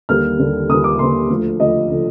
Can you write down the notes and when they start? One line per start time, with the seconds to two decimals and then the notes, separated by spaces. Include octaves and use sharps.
0.09 D#2 D3 G3 A#3 F6
0.39 D#2 D3 G3 A#3
0.69 D#2 D3 G3 A#3 D#6
0.84 D6
0.99 D#2 D3 G3 A#3 C6
1.30 D2 D3 F3
1.60 D2 D3 F3 D#5
1.90 D3 F3